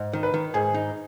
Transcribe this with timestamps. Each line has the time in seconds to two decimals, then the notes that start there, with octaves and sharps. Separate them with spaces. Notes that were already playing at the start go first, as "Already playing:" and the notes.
Already playing: G#2
0.13 D#3
0.23 B4
0.34 D#3
0.54 G#2 G#4
0.74 D#4